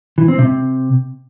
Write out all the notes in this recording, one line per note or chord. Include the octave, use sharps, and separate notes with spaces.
E3
C4
C3